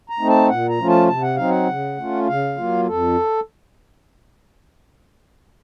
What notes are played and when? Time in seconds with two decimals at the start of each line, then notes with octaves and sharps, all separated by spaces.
0.10 A#5
0.19 A3 C4 D#4
0.29 A5
0.49 A#2 F#5
0.69 A#5
0.79 F3 A3 C#4 F4
0.88 A5
1.08 C3 A5
1.22 F#5
1.36 F#3 C4 D#4 F5
1.49 F#5
1.68 C#3
1.98 A3 C#4 F4
2.27 C#3 F5
2.57 F#3 A#3 F4
2.87 F2 A4